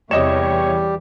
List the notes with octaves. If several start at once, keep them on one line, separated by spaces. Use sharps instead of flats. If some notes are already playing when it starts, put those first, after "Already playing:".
E2 C3 G3 G4 C#5 D#5 E7